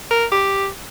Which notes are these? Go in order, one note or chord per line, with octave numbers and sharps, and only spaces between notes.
A#4
G4